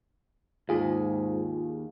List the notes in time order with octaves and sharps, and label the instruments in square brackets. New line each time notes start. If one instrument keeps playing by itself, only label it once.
[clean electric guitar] D#2 [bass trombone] G#2 [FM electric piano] F4 G#4